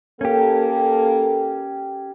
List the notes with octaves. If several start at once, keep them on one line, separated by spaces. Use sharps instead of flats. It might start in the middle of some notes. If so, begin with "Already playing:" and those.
A#3 C#4 G4 A4